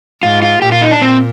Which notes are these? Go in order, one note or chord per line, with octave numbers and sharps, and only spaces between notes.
G#2 F4
F4
A#2 G4
F4
D#4
D4
A#2 C4